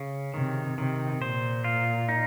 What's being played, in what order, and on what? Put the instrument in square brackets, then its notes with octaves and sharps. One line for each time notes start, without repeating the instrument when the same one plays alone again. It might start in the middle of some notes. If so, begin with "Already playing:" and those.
Already playing: [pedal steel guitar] C#3
[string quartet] C3 [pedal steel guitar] D#3
[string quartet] C3 [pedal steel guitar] D#3
[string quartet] A#2 [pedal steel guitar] C5
[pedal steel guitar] F4
D#4